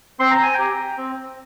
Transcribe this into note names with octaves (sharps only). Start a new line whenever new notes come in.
C4 C6
A#5
G#5
G4 G5 A#5
C4